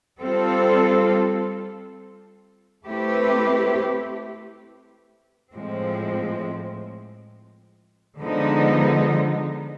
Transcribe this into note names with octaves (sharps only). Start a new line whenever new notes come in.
G3 C4 F4 A4
A3 C4 E4 G4 B4
A2 F3 G#3 C4
D3 F3 G#3 B3 D#4